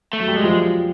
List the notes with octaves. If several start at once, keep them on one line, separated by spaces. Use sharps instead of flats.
A3
F#3
G3
G#3
F3